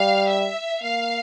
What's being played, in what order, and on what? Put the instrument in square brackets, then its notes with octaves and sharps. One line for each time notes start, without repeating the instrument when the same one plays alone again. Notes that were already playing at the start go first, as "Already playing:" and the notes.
Already playing: [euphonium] G3 [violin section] F5
[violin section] E5
[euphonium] A#3 [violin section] F5